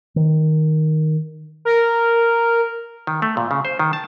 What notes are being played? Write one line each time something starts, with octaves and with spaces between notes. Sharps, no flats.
D#3
A#4
D#3
A3
A#2
C#3
C5
D#3
A5